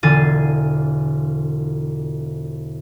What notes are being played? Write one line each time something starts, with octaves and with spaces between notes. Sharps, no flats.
E1 D3 F4 G#5 A6 C7